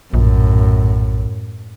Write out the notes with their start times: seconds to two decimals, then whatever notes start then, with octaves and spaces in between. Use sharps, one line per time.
0.14 A#1 F#2 A2